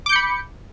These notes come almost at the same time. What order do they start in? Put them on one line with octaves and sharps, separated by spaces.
D6 G6 C#7 B5